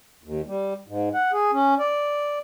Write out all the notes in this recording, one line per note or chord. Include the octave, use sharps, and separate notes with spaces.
D#2
G3
G#2
F#5
G#4
C#4
D5